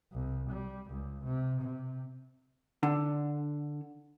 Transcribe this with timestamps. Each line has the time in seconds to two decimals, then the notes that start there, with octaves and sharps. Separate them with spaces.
0.13 C2
0.50 G3
0.90 C#2
1.24 C3
1.61 C3
2.83 D3